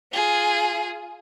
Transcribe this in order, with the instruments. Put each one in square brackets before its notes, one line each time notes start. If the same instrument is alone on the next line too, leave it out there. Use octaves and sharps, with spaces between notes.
[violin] F4 G#4